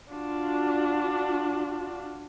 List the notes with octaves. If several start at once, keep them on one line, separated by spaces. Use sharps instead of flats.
D4 F4 F#4